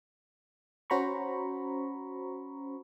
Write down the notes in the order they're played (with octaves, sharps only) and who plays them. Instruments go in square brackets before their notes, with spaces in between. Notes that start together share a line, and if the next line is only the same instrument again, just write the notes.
[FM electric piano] C#4 F#4 C5 A#5 B5 C#6